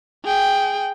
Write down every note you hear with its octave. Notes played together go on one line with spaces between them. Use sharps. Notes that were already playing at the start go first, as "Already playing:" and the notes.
G#4 G5